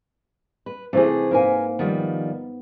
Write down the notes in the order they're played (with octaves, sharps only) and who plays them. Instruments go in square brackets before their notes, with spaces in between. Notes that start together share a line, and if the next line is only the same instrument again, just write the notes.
[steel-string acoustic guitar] B4
[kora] C3 E3 G4 [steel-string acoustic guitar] A3 E4 G#4
[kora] G#2 A#3 [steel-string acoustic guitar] A#4 B4 G#5
[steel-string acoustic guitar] D#3 F3 G3 [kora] B3